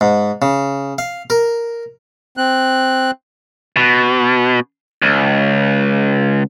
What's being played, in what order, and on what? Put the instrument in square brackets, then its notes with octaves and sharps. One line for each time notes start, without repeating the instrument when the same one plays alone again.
[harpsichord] G#2
C#3
F5
A#4
[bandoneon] C4 F#6
[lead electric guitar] B2
C#2